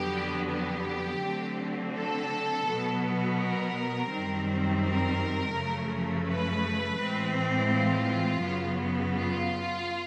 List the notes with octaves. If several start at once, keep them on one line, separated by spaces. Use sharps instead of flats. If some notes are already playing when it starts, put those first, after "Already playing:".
Already playing: F2 D3 F#3 B3 G4
G4
D3 F#3 A3 C4
A4
B2 F#3 B3
A#4
F#2 D#3 G3 C4
A#4
F#2 C#3 F3 A3
B4
A2 E3 G#3 C4
F4
F#2 C#3 F#3 B3
F4